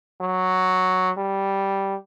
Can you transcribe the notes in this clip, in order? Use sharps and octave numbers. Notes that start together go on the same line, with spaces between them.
F#3
G3